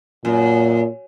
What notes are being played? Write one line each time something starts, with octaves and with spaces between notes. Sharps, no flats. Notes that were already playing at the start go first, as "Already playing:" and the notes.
F#2 A#2